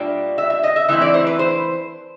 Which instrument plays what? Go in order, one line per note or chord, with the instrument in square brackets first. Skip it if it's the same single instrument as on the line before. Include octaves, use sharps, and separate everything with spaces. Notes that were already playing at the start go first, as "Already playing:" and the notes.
Already playing: [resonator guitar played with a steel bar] B2 G3 A#3 D4 F4 E5
E5
E5
D#5
E5
E3 A3 C4 E4 E5
D5
C5
B4
C5